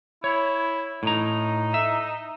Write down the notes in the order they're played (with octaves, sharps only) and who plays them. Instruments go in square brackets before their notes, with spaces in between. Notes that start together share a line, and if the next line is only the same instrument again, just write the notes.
[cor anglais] E4 [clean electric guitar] C#5
[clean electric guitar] A2 A#5 [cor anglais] D#4
[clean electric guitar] E5